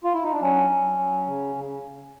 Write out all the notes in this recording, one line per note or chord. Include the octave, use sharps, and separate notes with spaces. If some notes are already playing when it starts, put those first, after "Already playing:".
F4
E4
D#4
D4
F#3 C#4
F#3
F#3
C#3
C#3